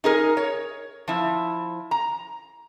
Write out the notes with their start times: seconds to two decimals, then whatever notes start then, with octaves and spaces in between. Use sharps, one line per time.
0.04 D#4 G#4 A#4
0.37 C#5
1.08 F3 E4
1.91 A#5